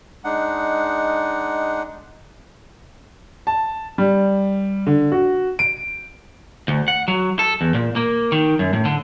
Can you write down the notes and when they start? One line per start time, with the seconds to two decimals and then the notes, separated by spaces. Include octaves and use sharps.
0.24 G#3 D4 D#4 F#5
3.47 A5
3.98 G3
4.87 D3
5.12 F#4
5.59 D7
6.68 D2
6.88 F#5
7.08 F#3
7.39 A4
7.61 E2
7.75 A#2
7.96 A#3
8.32 D#3
8.59 F#2
8.73 A2
8.85 D3